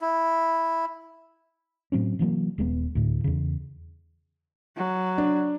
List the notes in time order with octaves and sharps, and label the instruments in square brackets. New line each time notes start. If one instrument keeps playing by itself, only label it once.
[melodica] E4
[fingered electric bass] A2 F#3 C4 C#4
C3 E3 F#3 A#3
D#1 G#3 A3 B3
D2 A2
E2 C#3
[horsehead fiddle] F#3
[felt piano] D4